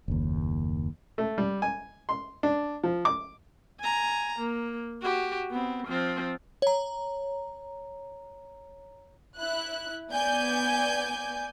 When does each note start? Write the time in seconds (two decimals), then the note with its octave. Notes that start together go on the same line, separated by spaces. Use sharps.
0.08 F#1 D#2
1.18 A3
1.38 G3
1.62 G#5
2.09 C6
2.43 D4
2.84 F3
3.05 D6
3.80 G#5 A#5
4.39 A#3
5.02 F#4 G4
5.51 B3 C4
5.87 F3 C4
6.62 C#5 A#5
9.39 E4 F#6
10.12 B3 D5 G#5 G6